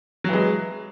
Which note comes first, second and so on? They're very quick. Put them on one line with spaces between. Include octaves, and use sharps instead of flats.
F#3 E3 G#3